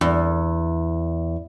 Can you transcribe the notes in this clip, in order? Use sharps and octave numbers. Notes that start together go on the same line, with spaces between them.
E2